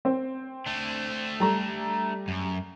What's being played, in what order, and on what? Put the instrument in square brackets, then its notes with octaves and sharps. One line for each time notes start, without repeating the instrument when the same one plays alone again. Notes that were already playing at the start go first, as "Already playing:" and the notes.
[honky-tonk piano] C4
[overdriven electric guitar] A3 D4
[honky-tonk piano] G3 A4 A#5
[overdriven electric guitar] F#2